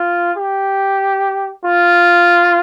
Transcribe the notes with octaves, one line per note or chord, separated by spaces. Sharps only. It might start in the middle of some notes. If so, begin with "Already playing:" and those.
Already playing: F4
G4
F4